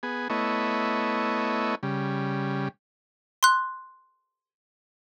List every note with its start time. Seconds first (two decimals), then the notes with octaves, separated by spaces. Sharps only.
0.03 B3 G#4
0.30 A3 B3 E4 C#5 D#5
1.83 C#3 G3
3.43 C6 F#6